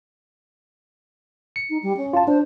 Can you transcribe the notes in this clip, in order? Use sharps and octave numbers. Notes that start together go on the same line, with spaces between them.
C#7
D#4
G3
C#4
F4 A5
D4 C5